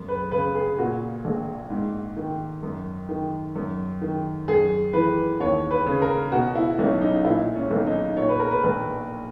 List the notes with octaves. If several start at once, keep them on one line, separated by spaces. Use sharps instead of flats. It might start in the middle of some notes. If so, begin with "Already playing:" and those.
Already playing: F#2
B4
C#3 B4
G#4
A#2 F#4
A#1
G#2
D#3
F#2
D#3
F#2
D#3
F#2 G#4
E3 B4
D#2 C#5
B4
C#3
A#4
B2 F#4
E4
B1 C#4
D#4
A#2 E4
C#4
B1
D#4
A#2 C#5
B4
A#4
B4
A#1 B4